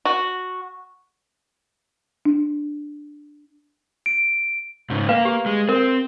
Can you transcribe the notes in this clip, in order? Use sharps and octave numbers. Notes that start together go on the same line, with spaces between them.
F#4
D4
D7
G#2 C#3
A#3 B4 F5
G4
G#3
C4 A#4